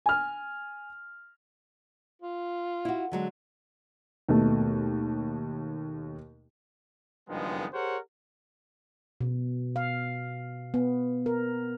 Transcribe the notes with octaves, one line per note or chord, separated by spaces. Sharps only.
G#5 F6
F4
E4 F#4
D3 F#3 G#3
D#2 B2 A3
F#1 G2 D#3 F3 G#3 B3
G4 G#4 A#4 C5 C#5 F#5
B2
F5
B3
A#4